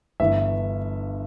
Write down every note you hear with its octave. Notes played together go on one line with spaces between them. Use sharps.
G1 G2 E3 E5